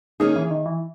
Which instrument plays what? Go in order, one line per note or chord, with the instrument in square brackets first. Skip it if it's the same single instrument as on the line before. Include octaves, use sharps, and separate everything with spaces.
[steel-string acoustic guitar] D#3 A#3 C#4 G#4 [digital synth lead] D#4
[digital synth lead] E3
D#3
E3